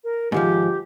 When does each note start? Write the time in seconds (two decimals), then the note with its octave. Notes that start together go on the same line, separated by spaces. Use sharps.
0.04 A#4
0.32 G#2 D#3 F3 G4